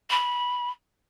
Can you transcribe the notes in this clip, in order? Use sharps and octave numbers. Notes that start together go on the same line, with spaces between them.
B5